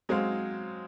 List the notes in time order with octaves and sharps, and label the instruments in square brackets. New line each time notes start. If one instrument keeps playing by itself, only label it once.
[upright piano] F#3 C4 F#4 C5 F5 [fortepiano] G#3